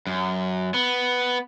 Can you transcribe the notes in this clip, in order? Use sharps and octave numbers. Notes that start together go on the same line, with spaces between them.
F#2
B3